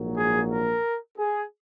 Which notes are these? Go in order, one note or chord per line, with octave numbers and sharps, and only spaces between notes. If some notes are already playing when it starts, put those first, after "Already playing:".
Already playing: A#1 G#2 F#3 A#3
G#4
A#4
G#4